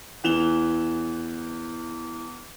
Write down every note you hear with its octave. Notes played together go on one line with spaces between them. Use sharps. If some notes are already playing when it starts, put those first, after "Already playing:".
E2 E3 E7 F7 G7